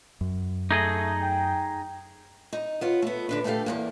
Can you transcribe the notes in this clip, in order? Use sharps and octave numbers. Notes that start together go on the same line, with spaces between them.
F#2
A3 D#4 G#4 D#5
G5
D#4
B3 F4 C#5
A3 B3
D3 D4 B4
A3 B3 E4 G4 A4 F5
E2 G2 A#3